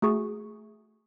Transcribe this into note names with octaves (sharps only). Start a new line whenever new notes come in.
A3 F#4 G#4 C#6